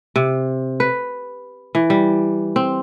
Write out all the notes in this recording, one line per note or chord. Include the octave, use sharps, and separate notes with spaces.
C3
B4
E3
G3
C4